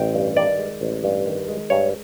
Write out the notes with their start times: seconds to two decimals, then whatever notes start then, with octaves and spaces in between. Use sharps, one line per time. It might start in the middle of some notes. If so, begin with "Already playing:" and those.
Already playing: A1 G5
0.15 G2
0.37 D#3 D5
0.59 G#3
0.81 A1
1.04 G2
1.26 D#3
1.48 G#3
1.70 G2 C#5